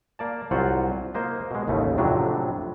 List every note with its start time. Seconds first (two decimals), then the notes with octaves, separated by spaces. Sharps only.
0.19 A#3 D5 A5
0.51 C2 F#3 F4 C5 F#5
1.14 A#3 C5 D#5
1.51 B2 G#3
1.67 A1 D#2 C#3 A3
1.98 F2 A2 C3 F#3 D4